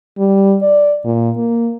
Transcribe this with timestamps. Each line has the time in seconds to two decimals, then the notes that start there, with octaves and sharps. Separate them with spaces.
0.18 G3
0.62 D5
1.04 A#2
1.37 A#3